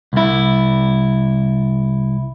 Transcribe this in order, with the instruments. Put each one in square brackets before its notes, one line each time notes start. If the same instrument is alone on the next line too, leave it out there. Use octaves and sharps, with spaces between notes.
[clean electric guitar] C2 E4